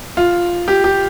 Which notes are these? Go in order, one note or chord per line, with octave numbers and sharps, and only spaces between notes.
F4
G4
G4